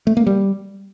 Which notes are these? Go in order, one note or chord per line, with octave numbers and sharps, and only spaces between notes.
A3
A#3
G3